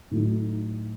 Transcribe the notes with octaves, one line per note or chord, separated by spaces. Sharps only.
A2 F#3 A3 D#4